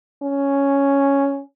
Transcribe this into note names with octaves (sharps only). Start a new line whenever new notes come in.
C#4